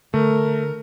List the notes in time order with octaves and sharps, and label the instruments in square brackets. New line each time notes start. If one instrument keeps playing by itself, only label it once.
[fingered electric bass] D3 [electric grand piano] A3 [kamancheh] A#4